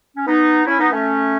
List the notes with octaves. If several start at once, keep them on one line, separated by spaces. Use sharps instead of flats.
C#4
B3 D#4
C#4 E4
B3 D#4
A3 C#4